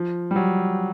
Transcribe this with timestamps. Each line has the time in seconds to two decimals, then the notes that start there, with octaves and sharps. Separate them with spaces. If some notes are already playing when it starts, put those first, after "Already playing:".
Already playing: F3
0.31 G3
0.36 F#3